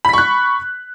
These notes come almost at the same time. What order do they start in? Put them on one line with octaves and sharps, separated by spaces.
B5 B6 C#6 F#6